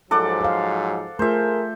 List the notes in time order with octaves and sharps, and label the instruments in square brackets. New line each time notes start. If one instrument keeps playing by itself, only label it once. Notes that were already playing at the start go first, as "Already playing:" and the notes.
[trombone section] G#2 F3 F#3 [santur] A4 D5 F#5
[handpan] C5 F5
[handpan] A3 F4 [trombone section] G#4 A#4 [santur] C5 E5